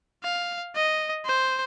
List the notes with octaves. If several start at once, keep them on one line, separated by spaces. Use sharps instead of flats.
F5
D#5
C5